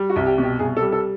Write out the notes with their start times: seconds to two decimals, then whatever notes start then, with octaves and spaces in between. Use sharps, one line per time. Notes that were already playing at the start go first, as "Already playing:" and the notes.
Already playing: G3
0.10 F#4
0.16 C2
0.26 G4
0.38 B2
0.43 G4
0.59 C2 G#4
0.77 A4
0.81 G3
0.92 A4